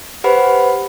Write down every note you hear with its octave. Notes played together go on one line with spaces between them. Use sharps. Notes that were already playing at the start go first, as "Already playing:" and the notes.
G4 B4 C5 F#5 B5